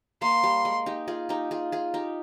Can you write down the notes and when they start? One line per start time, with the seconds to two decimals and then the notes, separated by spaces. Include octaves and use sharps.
0.22 A#3 C6
0.44 G3
0.65 G#3
0.86 D#4 G4
1.08 F4 G#4
1.29 D#4 G4
1.51 F4 G#4
1.72 F4 G#4
1.94 D#4 G4